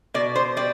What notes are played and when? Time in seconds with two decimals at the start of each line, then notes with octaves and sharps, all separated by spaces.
0.14 B2 D5
0.35 C5
0.57 G3 D5